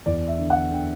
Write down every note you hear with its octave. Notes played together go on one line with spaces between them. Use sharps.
E2 D5
E5
D3
F#5
D3 G5